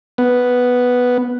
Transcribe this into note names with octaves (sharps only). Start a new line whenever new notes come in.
B3